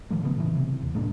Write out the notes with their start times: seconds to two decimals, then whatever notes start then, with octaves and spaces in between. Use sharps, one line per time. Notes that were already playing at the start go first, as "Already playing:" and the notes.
0.10 A1 D#3 F3 A3
0.23 C#3 B3
0.36 A2 C#3 E3
0.56 C3
0.82 D#2
0.95 A2 G#3 A#3 D4